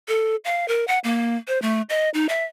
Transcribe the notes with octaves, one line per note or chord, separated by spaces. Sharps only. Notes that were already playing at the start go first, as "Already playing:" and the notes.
A4
F5
A#4
F#5
A#3
C5
A3
D#5
D#4
E5